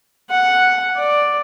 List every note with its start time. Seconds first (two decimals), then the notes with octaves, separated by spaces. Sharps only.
0.30 F#5
0.96 D5